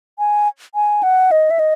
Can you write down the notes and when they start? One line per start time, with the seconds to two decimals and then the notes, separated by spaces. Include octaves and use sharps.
0.19 G#5
0.75 G#5
1.03 F#5
1.31 D#5
1.50 E5
1.59 D#5